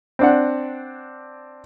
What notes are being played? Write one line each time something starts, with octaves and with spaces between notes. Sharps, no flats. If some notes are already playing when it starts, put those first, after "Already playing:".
C4 D4 F#5